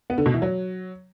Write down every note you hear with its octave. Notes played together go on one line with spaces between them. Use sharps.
B3
D3
B2
E3
F#3